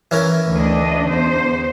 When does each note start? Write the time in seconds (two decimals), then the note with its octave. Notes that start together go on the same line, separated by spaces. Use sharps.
0.11 E3 C#4 A#4
0.54 D2 D4 D#5
1.09 E2 C5